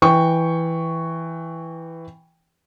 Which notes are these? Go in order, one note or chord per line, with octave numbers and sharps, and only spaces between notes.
E3 G5 C#6